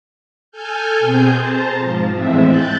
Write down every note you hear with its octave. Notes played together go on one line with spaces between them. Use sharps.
A4 G#5 F6 G6
B2 C4 G#4 G6
C5 A5 A#5
G#2 F3
E2 A2 G#3 B3 C4 E5
F#6 G6 A6